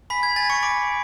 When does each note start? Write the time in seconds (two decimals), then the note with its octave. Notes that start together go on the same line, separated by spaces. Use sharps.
0.10 G#5 B5 B6
0.23 G#6
0.36 G#5 A6
0.50 C#6 C#7
0.63 B5 D6 D7